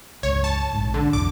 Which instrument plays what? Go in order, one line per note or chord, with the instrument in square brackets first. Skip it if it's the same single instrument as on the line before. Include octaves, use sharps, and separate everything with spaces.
[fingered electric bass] C#2 G2 [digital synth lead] C#5
[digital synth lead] A5
[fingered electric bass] A#1 G#2
[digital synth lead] D3
[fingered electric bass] B1 F2 E3 [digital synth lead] D6